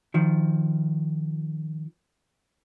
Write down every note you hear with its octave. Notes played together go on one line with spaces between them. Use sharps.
D#3 F3